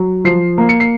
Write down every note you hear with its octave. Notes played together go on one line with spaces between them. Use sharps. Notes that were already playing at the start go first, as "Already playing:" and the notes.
Already playing: F#3
F3 C7
A#3
C#7
C7